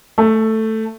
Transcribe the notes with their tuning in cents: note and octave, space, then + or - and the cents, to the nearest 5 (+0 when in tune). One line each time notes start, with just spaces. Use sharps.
A3 +5